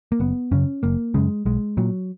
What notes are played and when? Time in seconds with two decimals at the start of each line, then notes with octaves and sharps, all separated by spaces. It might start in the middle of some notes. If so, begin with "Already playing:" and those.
0.12 A#3
0.20 F#1 B3
0.51 F#2 C#3 C#4
0.83 F#1 A#3
1.14 F#2 C#3 G#3
1.45 B1 G#3
1.77 A#2 F#3